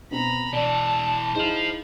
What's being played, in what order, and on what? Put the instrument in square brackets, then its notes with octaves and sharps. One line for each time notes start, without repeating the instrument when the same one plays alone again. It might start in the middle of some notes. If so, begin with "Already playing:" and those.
[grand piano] B2 B3 C4 [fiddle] A#5 B5
[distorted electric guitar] B2 E3 [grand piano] D5 [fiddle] A5
[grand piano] D#4 E4 G#4 [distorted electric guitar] C5 F5